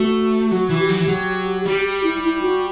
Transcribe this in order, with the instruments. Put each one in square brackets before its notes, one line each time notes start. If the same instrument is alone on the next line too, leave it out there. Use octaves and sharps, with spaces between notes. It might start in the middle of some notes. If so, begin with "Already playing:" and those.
Already playing: [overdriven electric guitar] A3 [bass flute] F#4
[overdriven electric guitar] F#3 [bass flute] F#4
[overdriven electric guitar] E3
[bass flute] G4
[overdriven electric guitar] F#3
E3
[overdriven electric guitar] F#3 [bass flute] G4
[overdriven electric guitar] G3 [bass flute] G4
[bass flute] G4
E4
E4
F#4